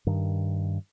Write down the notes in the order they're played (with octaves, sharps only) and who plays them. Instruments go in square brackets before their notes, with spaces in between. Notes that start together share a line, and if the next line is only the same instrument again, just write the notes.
[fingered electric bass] G2 D#3